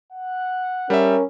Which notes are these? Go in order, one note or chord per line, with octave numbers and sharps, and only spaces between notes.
F#5
G3 C#4 A#4 E5